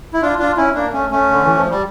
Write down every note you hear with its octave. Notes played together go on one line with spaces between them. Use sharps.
E4
D4 F4
D4 F4
C#4 E4
A#3 D4
A3 C#4
A3 C#4
D3
E3
F3
G3